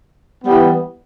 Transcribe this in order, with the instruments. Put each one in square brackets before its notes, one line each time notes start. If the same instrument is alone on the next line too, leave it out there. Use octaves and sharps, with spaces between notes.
[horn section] E3 G3 B3